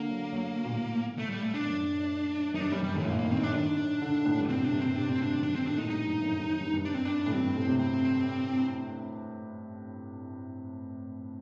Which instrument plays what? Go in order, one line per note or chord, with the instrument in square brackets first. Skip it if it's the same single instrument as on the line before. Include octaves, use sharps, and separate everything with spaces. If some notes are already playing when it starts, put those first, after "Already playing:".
Already playing: [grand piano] D3 [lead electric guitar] A#3
[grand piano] F#3
F#3
A#2
A2
[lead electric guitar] A3
G3
A3
D4
[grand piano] F#2
[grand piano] F#2 [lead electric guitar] D#4
[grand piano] G2 [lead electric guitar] D4
[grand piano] F#2 [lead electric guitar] G3
[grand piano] G2 [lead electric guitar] G3
[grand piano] A2 [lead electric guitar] D#3
[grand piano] A#2 [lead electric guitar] A#3
[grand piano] D#3 [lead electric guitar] A#3
[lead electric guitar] C4
D4
[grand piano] D#3 [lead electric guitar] D4
[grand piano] D3
A2
G2
[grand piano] A#2 [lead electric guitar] C4
[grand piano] C3
[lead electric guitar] D4
[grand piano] G2
[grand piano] A#2 [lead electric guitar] C4
[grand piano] C3 [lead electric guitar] D4
[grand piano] A2 [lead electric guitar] C4
[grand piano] D3 [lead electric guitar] D4
[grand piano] D#3
[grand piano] F#3 [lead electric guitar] D4
[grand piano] D#3 [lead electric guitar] C4
[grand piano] A#2 [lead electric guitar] D4
[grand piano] A2
[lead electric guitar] D#4
[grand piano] G2 [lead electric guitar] D#4
[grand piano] G2
F#2
G2
F#2
G2
G2
[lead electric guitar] D4
C4
D4
[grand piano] A2
[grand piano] G2 [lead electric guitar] C4
[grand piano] G2
A2
C3
[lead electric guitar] C4